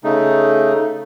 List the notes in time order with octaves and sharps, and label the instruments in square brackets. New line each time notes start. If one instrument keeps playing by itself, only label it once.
[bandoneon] C#3 A3 D#4